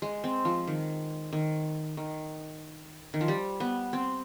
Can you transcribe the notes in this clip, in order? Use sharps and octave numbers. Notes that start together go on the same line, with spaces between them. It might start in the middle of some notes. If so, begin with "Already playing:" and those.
G#3
C4
F3
D#3
D#3
D#3
D#3
F3
G3
B3
C4